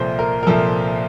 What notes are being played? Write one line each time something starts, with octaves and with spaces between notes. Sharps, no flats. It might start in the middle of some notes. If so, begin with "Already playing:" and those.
Already playing: C2 A#2 F3 A4 C5
A#4
A#4
C2 A#2 F3 A4